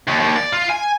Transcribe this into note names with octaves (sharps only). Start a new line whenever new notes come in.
D#2
D#2
D5
F4
G#5